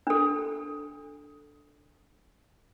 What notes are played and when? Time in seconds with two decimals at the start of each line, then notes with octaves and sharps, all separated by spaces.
0.07 D4 A4